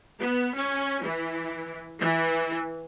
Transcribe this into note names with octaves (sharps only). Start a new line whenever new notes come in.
B3
C#4
E3
E3